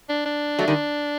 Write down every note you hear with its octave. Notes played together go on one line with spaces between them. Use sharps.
D4
D4
F#3 A3
D#3 G3